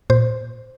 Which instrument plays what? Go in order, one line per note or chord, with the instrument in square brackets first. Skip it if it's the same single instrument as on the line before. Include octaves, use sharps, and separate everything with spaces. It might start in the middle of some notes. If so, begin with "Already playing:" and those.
[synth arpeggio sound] A#2 C5